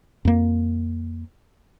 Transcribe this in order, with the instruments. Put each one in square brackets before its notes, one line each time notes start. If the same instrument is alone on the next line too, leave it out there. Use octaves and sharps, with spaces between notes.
[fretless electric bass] F2 A#3